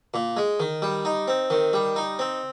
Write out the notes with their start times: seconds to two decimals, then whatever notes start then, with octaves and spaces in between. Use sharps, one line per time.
0.14 A#2
0.37 G#3
0.60 D#3
0.82 G3
1.05 D#4
1.28 C4
1.50 D#3
1.73 G3
1.96 D#4
2.19 C4